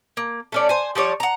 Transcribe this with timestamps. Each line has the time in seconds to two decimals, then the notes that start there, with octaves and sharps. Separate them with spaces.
0.17 A#3
0.52 A3 C#4 D5
0.69 C5 G#5
0.95 F3 G3 C#5 D5
1.20 F#5 A#5